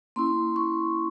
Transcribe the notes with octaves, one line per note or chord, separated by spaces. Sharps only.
A#3 C#4 E4 C6
C#6